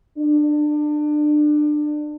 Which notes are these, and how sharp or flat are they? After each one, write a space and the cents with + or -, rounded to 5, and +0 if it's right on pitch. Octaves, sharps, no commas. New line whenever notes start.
D4 +25